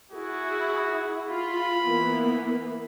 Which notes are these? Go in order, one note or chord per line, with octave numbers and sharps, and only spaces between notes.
E4 F#4 G#4
F4 B5
E3 A#3 B3